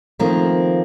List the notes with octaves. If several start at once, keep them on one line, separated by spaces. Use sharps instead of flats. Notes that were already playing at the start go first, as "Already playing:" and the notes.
D#3 F3 A3 A#3 C4